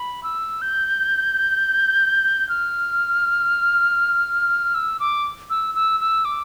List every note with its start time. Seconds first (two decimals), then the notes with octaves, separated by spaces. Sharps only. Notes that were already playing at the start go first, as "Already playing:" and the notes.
Already playing: B5
0.23 E6
0.62 G6
2.49 F6
4.75 E6
5.00 D6
5.50 E6
5.75 E6
6.00 E6
6.25 D6